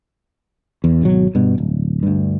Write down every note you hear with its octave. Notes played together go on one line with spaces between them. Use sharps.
E2
G#1 B2 F#3
G2 B2
D1
D2 G2